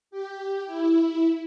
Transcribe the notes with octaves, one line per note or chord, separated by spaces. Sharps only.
G4
E4